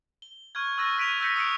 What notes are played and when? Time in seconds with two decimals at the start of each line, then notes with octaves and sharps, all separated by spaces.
0.22 G7
0.55 C#6 F6 F#6 G#6
0.77 C#6 E6 F#6 A6 A#6 D#7
0.98 F#6 B6 D7 D#7 F7
1.20 E6 F#6 G6 A#6 B6 C#7
1.35 D#6 E6 F#6 C#7 D7